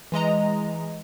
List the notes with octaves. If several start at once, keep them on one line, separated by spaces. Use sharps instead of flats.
E3 G#3 D#5 A#5